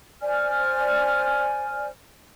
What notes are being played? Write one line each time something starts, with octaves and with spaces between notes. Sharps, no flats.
C5 D5 G#5 F6